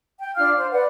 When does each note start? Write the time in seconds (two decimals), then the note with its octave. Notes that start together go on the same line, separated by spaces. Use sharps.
0.21 G5
0.37 D4 F4 F5 F6
0.57 C5
0.72 B4 D5 F#5